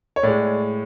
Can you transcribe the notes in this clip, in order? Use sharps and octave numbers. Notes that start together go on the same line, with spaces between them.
C#5
A2 G#3 D5